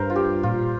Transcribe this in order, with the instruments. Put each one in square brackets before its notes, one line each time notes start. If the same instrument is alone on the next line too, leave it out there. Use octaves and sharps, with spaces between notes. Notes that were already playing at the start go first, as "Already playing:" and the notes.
Already playing: [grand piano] G2 [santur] A#4 C5 F5
[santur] F4
[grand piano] G3 [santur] G4
[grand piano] A#2 [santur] F4